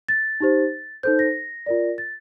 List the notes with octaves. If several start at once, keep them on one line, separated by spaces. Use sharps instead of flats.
A6
D#4 G4 C5
D#4 A4 C5 G6
A#6
F4 A#4 D5
A6